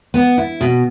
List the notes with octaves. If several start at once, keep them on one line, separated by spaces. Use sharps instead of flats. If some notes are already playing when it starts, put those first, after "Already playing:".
B3
E4
B2